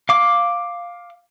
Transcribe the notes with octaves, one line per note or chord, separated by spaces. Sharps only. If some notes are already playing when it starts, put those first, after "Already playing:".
F5 D6